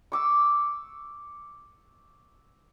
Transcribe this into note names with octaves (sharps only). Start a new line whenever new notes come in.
C#6 D6 E6